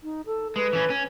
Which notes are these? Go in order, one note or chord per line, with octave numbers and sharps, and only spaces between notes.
D#4
A4
G#3 B4
E3 C#4
C#4